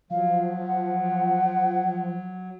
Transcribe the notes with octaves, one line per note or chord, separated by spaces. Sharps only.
F3 F#3 F5
F#5